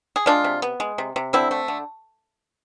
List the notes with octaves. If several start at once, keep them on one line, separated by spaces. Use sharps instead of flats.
G#4
G#3 D4 F4
C3
B3
G#3
C3
C3
D3 C4 E4
A3
D3